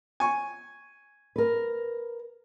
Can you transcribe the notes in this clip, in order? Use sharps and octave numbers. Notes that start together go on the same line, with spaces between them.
G#5 C#6
A#4 B4